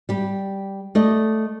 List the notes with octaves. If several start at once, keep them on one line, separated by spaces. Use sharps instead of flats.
G3 G4
A3 D5 D#5